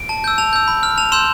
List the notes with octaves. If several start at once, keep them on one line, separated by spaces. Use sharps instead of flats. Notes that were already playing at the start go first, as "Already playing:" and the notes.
Already playing: D7
A5
E6 G6
A5 F7
E6 G6
B5
F6
A5 F7
C6 E6 G6 E7